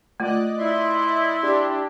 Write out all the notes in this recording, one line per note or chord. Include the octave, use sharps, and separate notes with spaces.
A3 F4 D5 D#5 F#6
E4 E5 C6
D4 G4